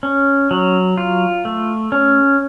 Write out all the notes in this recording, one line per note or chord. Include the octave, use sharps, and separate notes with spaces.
C#4
F#3
F4
A3
C#4